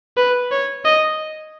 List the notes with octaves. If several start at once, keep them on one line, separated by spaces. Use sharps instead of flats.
B4
C#5
D#5